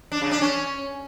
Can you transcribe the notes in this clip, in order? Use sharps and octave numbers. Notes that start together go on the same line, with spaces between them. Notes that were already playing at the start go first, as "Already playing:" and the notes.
D4
C#3
D4
C#4